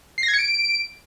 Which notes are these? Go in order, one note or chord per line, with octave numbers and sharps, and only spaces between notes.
C7
A#6
G#6
C#7
D7